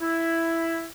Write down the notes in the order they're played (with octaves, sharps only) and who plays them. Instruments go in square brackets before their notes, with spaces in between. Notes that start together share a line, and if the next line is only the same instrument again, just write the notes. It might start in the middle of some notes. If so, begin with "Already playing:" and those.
[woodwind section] E4